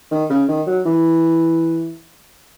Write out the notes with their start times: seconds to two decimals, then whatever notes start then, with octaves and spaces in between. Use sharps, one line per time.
0.11 D#3
0.30 C#3
0.48 D#3
0.67 F#3
0.86 E3